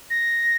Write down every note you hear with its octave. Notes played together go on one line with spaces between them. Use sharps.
A#6